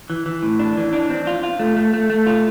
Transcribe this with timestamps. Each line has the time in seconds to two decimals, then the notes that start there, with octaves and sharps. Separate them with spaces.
0.10 E3
0.26 E3
0.43 A2
0.59 D4
0.77 E3
0.93 D4
1.10 C4
1.27 F4
1.43 F4
1.59 A3
1.76 A3
1.94 A3
2.10 A3
2.27 F4